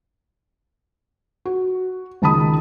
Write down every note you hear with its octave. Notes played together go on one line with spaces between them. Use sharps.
F#4
C#2 D#3 A5 B5 D#6